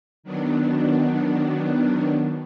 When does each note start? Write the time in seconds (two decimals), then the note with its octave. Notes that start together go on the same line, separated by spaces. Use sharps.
0.23 D#3 F#3 B3 D4